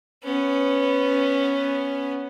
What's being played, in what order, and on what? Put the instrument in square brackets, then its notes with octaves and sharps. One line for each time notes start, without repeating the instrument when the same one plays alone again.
[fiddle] B3 C#4